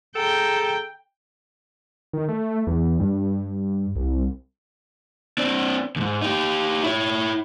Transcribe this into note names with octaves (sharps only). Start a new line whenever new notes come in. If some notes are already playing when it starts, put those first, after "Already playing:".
G#4 A4 G5 A#5
D#3
A3
E2
G2
C2
C4 D4
D#2 G#2
D#4 G4
E4 C#5